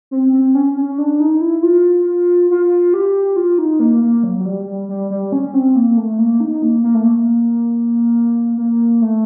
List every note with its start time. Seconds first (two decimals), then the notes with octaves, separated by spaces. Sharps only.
0.11 C4
0.33 C4
0.55 C#4
0.77 C#4
0.98 D4
1.20 D#4
1.41 E4
1.63 F4
2.51 F4
2.94 G4
3.36 F4
3.58 D#4
3.80 A#3
4.02 A#3
4.24 F#3
4.39 F#3
4.45 G3
4.66 G3
4.89 G3
5.10 G3
5.32 C#4
5.54 C4
5.76 A#3
5.97 A3
6.19 A#3
6.40 D#4
6.62 A#3
6.83 A#3
6.95 A3
7.04 A#3
8.58 A#3
9.01 A3